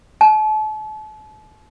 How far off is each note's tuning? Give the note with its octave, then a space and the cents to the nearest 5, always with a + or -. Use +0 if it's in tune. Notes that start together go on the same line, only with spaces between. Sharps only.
A5 -35